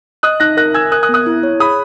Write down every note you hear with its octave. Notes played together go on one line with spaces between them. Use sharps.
D#5 D#6 F#6
D#4 F#6 A#6
A#4 F#6 A#6
G#5 E6 G#6
A#4 D#6 F#6
D#6 F#6
B3
D#6 F#6
E4
C#5
G#4 B5 D#6